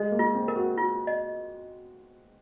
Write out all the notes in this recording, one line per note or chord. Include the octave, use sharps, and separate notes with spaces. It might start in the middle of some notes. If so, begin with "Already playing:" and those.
Already playing: G#3 D#5
A#3
F4
C4
A#4
F#4
F4
D#5